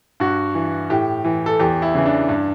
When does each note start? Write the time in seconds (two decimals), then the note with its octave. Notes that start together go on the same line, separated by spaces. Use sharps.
0.20 G2 F#4
0.55 E3
0.90 A2 G4
1.24 E3
1.46 A4
1.59 E2 G4
1.82 E4
1.95 C#3 E3
2.06 D4
2.29 G2